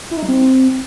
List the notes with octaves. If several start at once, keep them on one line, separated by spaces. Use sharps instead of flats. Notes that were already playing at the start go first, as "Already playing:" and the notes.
E4
D#4
G3
C4